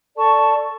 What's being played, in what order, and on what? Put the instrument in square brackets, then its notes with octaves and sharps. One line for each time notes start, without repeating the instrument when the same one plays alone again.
[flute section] A4 D5 A5 C#6